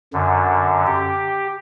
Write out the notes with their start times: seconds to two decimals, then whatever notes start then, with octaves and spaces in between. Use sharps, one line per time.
0.13 F#2 D3
0.86 G4